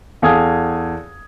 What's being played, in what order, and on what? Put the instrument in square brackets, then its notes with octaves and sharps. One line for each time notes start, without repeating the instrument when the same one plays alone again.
[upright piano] E2 A4 F5 G#5 D#6 G#6